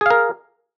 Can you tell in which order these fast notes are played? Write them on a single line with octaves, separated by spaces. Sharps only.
G#4 F5 A#4